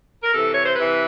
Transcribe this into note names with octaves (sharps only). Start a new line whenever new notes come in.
A#4
C3 E3 A4
C#5
C5
C3 E3 B4